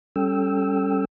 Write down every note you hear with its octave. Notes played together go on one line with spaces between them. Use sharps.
G3 C#4 A4 G5 E6